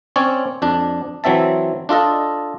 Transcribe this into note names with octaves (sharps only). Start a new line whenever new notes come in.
C4 C#4 C#5 D5
F2 D4
E3 F#3 C4 E5 A5
D4 F4 A4 D#5